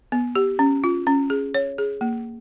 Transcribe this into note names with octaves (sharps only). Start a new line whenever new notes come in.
B3
G4
C#4
F4
C#4
G#4
C#5
G#4
A#3